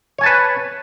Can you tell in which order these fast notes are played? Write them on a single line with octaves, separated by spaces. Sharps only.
C#5 G#5 A5 B4